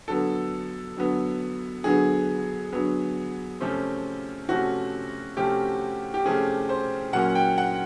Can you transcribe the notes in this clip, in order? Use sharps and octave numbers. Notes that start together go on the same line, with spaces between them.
D3 F#3 B3 A4
D3 F#3 B3
D3 F#3 B3 G#4
D3 F#3 B3
C3 F3 A3 C#4
C3 F3 A3 C#4 F#4
C3 F3 A3 C#4 G4
G4
C3 F3 A3 C#4 G#4
C5
A#2 F#3 A#3 C#4 F#5
G5
F#5